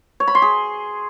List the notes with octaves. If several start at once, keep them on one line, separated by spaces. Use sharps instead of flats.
C#5
B5
C6
G#4